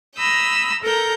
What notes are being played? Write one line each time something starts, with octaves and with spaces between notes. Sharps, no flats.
A#5 B5 D#6 E6 G6
A4 A#4 A#5 G6